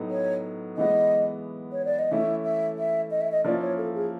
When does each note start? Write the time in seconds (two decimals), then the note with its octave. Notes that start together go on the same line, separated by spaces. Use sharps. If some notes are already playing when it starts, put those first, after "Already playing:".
Already playing: A2 F#3 B3 D#4
0.11 C#5
0.77 E3 G#3 B3 D#5
1.72 C#5
1.85 D5
1.99 D#5
2.11 E3 A3 C#4 E4 E5
2.44 E5
2.78 E5
3.11 D#5
3.21 E5
3.32 D#5
3.45 F3 A#3 C#4 E4 D5
3.61 C#5
3.77 A4
3.94 G#4